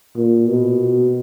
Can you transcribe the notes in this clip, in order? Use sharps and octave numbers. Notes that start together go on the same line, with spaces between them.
A#2
B2